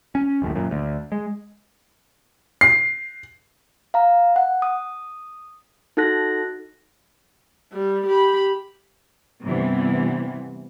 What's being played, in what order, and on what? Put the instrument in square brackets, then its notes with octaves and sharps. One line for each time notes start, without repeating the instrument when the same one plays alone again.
[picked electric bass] C#4
F#1 D#2 A2
F#2 A#2
D2
G#3
[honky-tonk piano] C7
[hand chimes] F5 A#5
F#5
D#6
D#4 F#4 A4 F#6 A#6
[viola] G3
G4 B5
[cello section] G2 C3 E3 B3